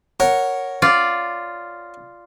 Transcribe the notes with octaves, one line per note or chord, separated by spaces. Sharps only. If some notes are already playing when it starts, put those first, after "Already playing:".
A#4 C#5 F#5
F4 D5